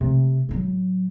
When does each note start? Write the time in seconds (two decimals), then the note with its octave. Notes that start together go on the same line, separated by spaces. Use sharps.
0.01 C3 A3
0.49 A2 F#3